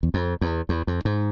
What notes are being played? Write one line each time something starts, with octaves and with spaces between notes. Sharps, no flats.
E2
F2
E2
E2
F2
G#2